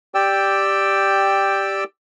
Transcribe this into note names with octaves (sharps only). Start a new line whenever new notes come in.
G4 D5 G5 E6